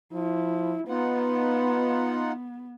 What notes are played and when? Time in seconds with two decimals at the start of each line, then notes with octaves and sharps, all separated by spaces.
0.13 F3 E4
0.88 B3 D#4 F4 B4 F#5